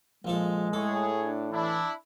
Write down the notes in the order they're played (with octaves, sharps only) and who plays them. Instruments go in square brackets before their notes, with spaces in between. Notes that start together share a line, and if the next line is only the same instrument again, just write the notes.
[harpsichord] A#1 F3 A4 [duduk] G#3
[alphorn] A2 [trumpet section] G#4 C#5 [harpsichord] A4
[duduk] D4
[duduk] E3 [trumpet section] D4 E4